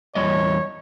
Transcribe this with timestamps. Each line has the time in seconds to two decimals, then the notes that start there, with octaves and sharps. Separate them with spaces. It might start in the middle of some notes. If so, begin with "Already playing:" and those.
0.15 E2 G3 C#5 D#5